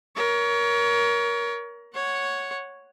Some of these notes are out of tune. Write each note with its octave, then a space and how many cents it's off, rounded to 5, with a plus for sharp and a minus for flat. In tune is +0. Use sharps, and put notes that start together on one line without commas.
A#4 +20 C#5 +30
C#5 +0 F#5 +0